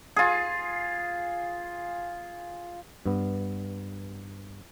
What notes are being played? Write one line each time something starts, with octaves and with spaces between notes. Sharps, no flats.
F4 G#4
G2 B3